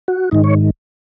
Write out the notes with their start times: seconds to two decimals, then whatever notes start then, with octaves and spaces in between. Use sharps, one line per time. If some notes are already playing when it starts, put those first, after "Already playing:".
0.08 F#4
0.31 G#2 D#3 D#4
0.44 C#5